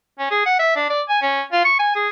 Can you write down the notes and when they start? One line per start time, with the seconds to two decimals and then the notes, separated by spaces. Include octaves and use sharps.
0.19 C#4
0.31 G#4
0.46 F#5
0.59 E5
0.76 D4
0.90 D5
1.09 G#5
1.22 C#4
1.52 F4
1.65 C#6
1.79 G#5
1.96 G#4